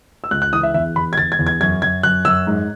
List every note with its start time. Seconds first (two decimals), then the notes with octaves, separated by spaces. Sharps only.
0.24 E6
0.31 C#2 F#6
0.42 F#6
0.53 E3 D#6
0.63 E5
0.74 E2 E5
0.96 E2 B5
1.13 G#6
1.17 E2 A6
1.32 G#6
1.39 E2
1.46 G#6
1.61 F#2 G#6
1.82 F#2 G#6
2.03 F#2 F#6
2.25 F#2 E6
2.47 G#2